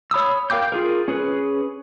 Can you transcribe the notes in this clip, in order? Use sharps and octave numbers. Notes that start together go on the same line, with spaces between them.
C#5 B5 D#6 E6
A#4 F5 G5 D6 G6
F4 G#4 A#4
C#4 G#4 B4